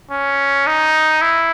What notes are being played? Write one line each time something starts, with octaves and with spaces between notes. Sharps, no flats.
C#4
D#4
E4